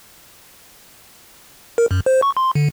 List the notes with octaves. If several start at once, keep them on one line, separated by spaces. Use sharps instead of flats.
A#4
F#2
C5
C#6
C6
D3